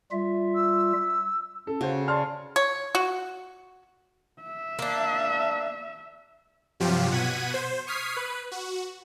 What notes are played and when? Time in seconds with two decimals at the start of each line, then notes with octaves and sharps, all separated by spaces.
0.12 G3 F4 E5
0.55 E6
1.67 C#4 A4
1.81 C#3 F#4 C5
2.08 D5 A5 C6 F6
2.56 C#5
2.95 F#4
4.42 E5
4.79 A#3 D4
6.80 G2 C3 F3 F#3 F4 G4
7.11 B2 F#5 G#6 B6 D#7
7.54 C5
7.87 C#6 D#6 F6 G#6 B6 C7
8.17 B4
8.51 F#4